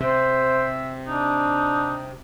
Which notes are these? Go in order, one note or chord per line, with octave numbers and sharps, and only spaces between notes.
C3 C5 E5
D4 D#4